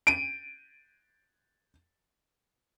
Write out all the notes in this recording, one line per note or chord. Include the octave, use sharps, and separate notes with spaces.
D7 D#7